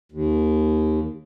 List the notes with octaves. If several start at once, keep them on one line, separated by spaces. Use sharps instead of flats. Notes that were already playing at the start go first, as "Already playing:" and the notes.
D#2